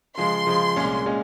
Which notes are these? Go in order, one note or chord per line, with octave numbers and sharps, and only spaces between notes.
C#3 F3 G#3 C6
C#3 F3 G#3
C2 A#2 G#3 C#4
A#2 G#3 C#4